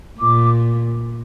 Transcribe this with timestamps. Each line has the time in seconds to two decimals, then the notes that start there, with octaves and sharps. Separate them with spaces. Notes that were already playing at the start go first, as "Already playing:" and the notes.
0.19 A#2 D6